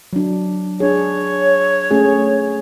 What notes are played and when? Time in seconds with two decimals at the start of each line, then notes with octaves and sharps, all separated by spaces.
0.13 F#3 D4
0.80 D4 G#4 C#5
1.91 A3 C#4 G#4